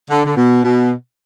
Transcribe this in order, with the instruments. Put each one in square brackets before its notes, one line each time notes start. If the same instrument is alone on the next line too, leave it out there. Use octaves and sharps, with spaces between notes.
[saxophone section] D3
D3
B2
B2